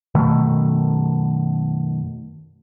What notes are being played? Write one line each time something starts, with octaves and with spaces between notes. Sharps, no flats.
F#2 B2 D#3 A3